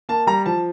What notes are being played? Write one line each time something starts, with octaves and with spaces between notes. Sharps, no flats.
A#3 A5
G3 A#5
F3 A5